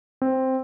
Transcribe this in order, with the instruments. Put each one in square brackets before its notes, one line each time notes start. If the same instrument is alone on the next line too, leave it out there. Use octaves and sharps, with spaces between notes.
[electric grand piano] C4